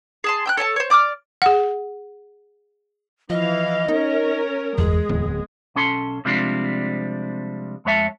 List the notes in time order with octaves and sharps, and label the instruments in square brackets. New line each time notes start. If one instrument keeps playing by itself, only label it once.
[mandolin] G#4 A5 C6
G5 E6 F#6
A4 C#5 G5 A5
C5 C#5
D5 D6 D#6 F6
[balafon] G#4 F#5
[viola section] E3 F5 [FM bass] F3 [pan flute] D#5
[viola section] C#4 A#4 [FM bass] D#4
[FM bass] G1 [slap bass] E2 [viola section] G#3 [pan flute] G#4
[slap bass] D1 B3 [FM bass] E2
[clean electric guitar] B1 C#4 A4 C6
C3 F3 G3 G#3 C4 D4
F2 G#3 C#5 E5 A5